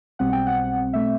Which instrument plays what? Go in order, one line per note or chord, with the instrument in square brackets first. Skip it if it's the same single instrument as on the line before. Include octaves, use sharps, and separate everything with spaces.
[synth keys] B1 B2 G3 C4 F#5
G5
F#5
B2 A3 C4 E5